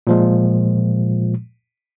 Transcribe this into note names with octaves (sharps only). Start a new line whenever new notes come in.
A#2 F3 G#3